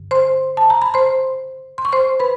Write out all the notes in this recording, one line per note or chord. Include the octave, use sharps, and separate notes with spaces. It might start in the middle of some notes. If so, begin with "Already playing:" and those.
Already playing: G2 D3
C5 C6
A5
A#5
B5
C5 C6
C6
C#6
C5 C6
B4 B5